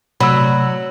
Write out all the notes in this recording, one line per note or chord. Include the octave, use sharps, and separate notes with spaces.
C3 F#3 A3 B5 E6